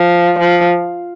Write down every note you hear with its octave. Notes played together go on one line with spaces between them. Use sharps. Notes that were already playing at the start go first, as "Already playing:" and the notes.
Already playing: F3
F3